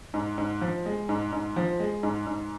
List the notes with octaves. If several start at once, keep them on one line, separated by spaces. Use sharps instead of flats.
G#2
G#2
F3
G#3
G#2
G#2
F3
G#3
G#2
G#2